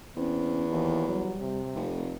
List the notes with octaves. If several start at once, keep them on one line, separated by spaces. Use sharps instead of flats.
E2 C4 C#4
D#2 E3
F#3 G3
C3
F1 A3